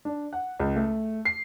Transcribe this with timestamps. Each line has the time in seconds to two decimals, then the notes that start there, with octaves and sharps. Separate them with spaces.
0.05 D4
0.33 F#5
0.60 C#2
0.76 A3
1.25 C7